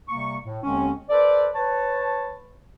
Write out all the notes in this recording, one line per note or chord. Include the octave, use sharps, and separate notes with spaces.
C3 G3 A#3 C#6
A2
D#2 D3 G#3 C4 C#4
A4 B4 C5 D5
B4 C#5 A5